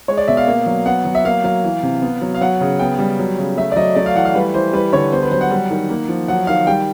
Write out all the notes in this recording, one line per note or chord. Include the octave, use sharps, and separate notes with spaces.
G#3 C#5
D5
B2 E5
F5
A#3
F#3
B3 F#5
F#3
E5
A#3 F5
F#3 F5
E3
C3
B3
F#3
F5
F#3 F#5
C#3
B3 G5
G3
F#3
C#3
A3 E5
D5
F#3 D#5
A3 D5
F5
E3 F#5
F5
G3 B4
E3 C5
G3 B4
D3 C#5
B3 C5
B4
F#3 C5
F#5
G3
D#3
A#3
F3
F#3 F#5
D#3 F5
G3 G5